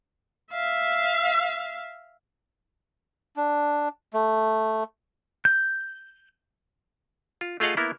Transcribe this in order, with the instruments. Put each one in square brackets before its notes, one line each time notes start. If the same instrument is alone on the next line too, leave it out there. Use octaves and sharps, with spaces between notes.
[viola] E5 F5
[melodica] D4
A3
[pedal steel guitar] G6
[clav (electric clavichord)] F4
A3 F4 G#4 D#5 F5 F#5
A#3 B3 E4 A#4